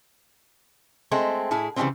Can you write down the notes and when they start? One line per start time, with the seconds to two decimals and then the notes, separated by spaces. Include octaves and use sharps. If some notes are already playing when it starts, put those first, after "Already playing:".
1.11 G#3 A3 C4
1.51 A2 E4 G#4
1.76 C#3 E3 F3 G3 G#3 C4